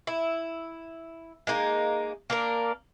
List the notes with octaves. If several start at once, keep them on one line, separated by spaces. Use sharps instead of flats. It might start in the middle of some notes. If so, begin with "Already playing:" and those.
E4
G#3 A#3 D#4
A#3 D4 A#4